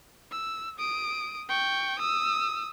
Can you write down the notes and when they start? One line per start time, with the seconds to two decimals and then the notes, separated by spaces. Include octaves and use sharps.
0.32 E6
0.79 D#6 D7
1.49 G5 C#6
1.99 D#6 E6